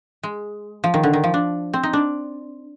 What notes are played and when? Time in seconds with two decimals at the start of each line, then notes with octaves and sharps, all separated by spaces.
0.23 G#3
0.84 F3
0.94 D#3
1.03 D3
1.13 D#3
1.24 F3
1.34 D4
1.73 C4
1.83 D#4
1.93 D4